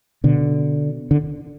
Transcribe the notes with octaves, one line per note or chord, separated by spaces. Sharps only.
B2 D3
D3